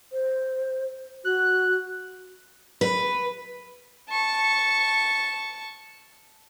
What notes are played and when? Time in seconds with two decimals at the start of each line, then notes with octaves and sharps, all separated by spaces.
0.12 C5
1.25 F#4 F#6
2.81 B4
4.10 A5 C#6